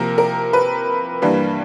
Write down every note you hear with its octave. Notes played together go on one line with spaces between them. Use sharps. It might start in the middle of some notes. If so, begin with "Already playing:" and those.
Already playing: C3 F3 A#3 A#4
A#4
B4
G2 E3 G3 A#3